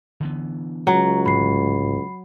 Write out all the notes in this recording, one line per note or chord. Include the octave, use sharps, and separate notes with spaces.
D3 E3 B3
C#2 F#3 A#5
A1 G#2 D3 B5 C7